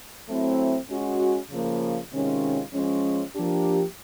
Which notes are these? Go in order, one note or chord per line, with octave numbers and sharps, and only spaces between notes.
F#3 A3 C4 E4
G#3 C#4 F#4
C#3 F3 A#3
C3 D#3 G#3 C#4 F4
F3 G#3 C#4
F3 A#3 D4 G4